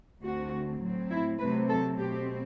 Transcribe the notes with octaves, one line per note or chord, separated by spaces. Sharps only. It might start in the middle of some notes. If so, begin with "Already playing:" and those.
D2 D3 A3 C4 F#4
A2 F#3 C4
E4
C3 F#3 A3 C4 B4
A4
B2 A3 C4 G4